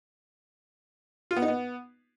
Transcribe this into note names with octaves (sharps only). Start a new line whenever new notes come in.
F4
B3
D#4
B3